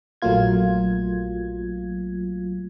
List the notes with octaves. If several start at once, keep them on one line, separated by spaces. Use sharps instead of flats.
A#1 F#3 A3 A#3 F4 G#6